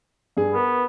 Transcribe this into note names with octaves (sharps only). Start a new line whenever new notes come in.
G2 G#4
B3 A#4 B4